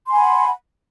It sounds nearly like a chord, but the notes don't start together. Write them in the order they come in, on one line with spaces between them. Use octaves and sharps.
C6 G#5 B5 F#5